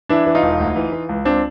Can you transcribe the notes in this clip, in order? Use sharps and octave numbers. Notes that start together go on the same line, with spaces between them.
E3 D4 E4
E3
D#4 F4
E1
D2
E3
E3
C#2
C#2 C4 D4